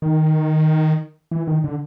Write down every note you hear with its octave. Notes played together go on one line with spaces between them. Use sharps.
D#3
E3
D#3
D3